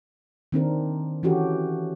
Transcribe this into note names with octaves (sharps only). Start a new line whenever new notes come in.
D#3 C4 D4 A#4
E3 C#4 F#4 G4 A4